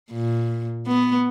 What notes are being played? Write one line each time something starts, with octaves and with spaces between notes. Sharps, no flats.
A#2
B3